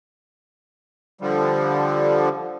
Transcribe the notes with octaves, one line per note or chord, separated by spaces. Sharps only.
D3 F3 G3